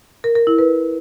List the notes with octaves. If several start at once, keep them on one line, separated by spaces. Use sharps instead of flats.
A#4
A#4
E4
B4